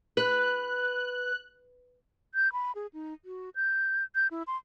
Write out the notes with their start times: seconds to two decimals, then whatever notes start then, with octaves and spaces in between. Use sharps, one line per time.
0.17 B4 F#6
2.35 G6
2.52 B5
2.75 G#4
2.93 D#4
3.25 F#4
3.56 G6
4.15 G6
4.31 E4
4.47 C6